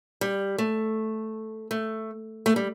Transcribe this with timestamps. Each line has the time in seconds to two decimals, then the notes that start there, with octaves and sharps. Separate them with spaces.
0.21 G3
0.58 A3
1.71 A3
2.46 A3
2.56 G3